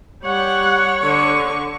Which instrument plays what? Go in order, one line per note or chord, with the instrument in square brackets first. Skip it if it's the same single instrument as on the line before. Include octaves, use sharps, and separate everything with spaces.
[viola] G3 F#5 [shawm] C#5
[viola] D3 C#6